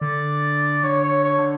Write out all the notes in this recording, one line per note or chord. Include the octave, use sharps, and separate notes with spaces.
D3 D5
D3 C#5
C#5
D3
C#5
D3